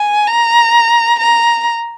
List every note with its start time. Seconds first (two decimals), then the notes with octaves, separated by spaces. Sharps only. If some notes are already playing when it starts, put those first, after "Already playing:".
Already playing: G#5
0.28 A#5
1.19 A#5